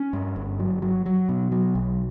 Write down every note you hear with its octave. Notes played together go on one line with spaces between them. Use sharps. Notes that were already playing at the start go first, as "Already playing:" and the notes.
Already playing: C#4
G2
G1
F#3
F#3
F#3
B2
F#3
B1